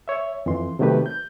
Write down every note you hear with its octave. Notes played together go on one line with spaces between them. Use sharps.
C#5 E5
F2 E3 C6
C3 D#3 F#3 A3 G4 B4
G6